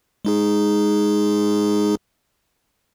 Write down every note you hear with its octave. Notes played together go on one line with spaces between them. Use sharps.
G#3 D#4 G#4